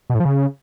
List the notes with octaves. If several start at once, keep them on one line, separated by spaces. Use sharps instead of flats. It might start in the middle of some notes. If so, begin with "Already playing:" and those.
B2
A2
F3
C#3